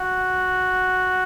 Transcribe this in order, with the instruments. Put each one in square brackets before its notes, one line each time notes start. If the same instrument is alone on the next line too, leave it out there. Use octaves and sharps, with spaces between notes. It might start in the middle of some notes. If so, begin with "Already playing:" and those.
Already playing: [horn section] F#4